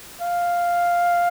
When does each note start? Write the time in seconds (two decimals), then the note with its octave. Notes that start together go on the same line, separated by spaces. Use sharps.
0.21 F5